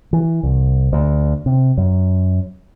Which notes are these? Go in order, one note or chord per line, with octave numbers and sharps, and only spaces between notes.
E3
C2
D2
C3
F#2